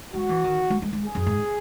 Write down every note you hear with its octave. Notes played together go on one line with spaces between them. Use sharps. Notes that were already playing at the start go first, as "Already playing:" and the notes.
G#3 F#4
E3
D#3
G#3
G#3
G#3
G#4
F#2
G#2